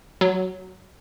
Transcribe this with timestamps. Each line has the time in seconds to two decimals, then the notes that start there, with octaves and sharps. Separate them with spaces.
0.21 F#3